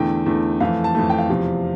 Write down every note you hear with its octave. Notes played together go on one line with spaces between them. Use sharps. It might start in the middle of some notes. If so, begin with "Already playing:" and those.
Already playing: E2 D3 A3 G5
E2 D3 A3
F2 E3 A3 F5
A5
F2 E3 A3
G5
F5
E2 C3 F3